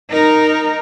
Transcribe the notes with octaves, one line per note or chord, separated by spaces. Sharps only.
D#4 A#4